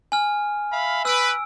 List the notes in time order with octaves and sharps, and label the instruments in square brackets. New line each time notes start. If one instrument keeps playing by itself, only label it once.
[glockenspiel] G#5 F6
[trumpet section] E5 F5 B5
[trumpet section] B4 [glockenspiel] E6 D7